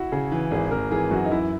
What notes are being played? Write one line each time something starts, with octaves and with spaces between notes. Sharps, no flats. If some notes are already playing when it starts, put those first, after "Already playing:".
Already playing: E4 F#4
C#3 G#4
E3
G#1 G#4
G#1 A#4
E3 G#4
F#2 F#4
D#4
E3 E4